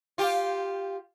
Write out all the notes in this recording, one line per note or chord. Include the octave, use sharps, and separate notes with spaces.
F4 G4